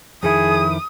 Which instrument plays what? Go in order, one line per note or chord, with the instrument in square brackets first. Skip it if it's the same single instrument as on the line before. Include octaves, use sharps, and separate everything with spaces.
[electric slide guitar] F2 D#3 E4 [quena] G#4 [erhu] D#6